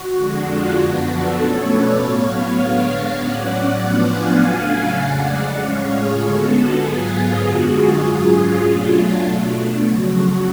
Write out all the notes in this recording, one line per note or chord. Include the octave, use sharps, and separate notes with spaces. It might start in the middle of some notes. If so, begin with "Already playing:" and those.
Already playing: F#4
F2 D3 G#3 D4
F4
F#2 F3 B3 D4 F#4
F#4 A4
B2 A3 C#4 A4 C#5
B4 D5
A2 F#3 B3 C#5 F5
D3 G#3 B3 D4 C#5 F5
A2 F#3 C#4 D5 F#5
A2 F3 B3 D4
F5 G#5
C#3 F#3 A3 D4
F2 C#3 G#3 D5 F#5
A2 G#3 C#4 C#5 F5
F4 G#4
D3 G#3 B3 F#4 A4
G#2 F#3 B3 F4 G#4
F#2 D3 G#3 F#4
F4 G#4
G#2 F#3 C#4 F4 G#4
F4
B2 F#3 A3 D4
F#4
B2 A3 D4
F2 C#3 F#3 F#4